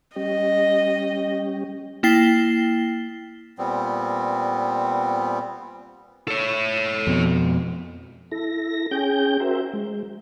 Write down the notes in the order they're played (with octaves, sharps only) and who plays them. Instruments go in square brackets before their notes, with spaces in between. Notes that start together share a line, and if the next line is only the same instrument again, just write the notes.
[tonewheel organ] G3 C#4 G4 [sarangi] D#5
[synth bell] A#3 E4 G5 A6 C7 G7
[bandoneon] A#2 G3 B3 C4
[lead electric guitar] A4 C#5
[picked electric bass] F2 B2
[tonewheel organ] E4 A4 A#6
C#4 G#4 G5 G6
F#4 A#4 C5 E5
G#3